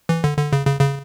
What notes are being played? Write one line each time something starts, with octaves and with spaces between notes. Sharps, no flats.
E3
D3
D3
C#3
C#3
C#3